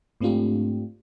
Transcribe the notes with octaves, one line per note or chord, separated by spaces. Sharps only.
G#2 A3 C4 D4 F4 G4